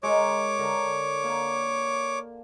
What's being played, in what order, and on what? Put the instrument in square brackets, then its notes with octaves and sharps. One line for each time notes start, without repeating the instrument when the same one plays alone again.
[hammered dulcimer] G#3 A#4 [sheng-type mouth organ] C#5 D6
[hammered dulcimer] D3 A#4
A#3